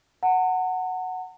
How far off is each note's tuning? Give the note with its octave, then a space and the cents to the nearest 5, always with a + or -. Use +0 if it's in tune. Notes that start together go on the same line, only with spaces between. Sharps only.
F#5 +0 A#5 -45